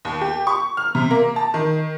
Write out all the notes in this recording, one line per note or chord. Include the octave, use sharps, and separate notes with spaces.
D#2
G4
C#6
F6
C3
A#3
A5
D#3